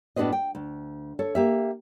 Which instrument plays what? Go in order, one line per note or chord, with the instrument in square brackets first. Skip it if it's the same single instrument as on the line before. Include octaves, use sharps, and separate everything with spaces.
[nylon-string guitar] A2 B3 D4 F#4 C5 D#5
G5
D2
A4 C#5
A#3 G4 E5